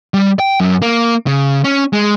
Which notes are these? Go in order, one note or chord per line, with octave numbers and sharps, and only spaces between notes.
G3
G5
F#2
A#3
C#3
C#4
G#3